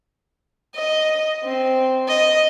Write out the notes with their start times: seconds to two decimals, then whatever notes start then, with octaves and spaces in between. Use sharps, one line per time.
0.75 D#5
1.44 C4
2.08 D#5